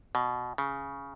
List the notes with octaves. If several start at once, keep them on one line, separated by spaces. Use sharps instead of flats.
B2
C#3